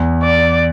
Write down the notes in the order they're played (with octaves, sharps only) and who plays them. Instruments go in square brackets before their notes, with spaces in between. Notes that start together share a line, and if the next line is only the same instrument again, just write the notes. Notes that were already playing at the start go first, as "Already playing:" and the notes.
Already playing: [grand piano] E2
[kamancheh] D5